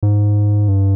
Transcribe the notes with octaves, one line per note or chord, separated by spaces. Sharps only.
G#2
G2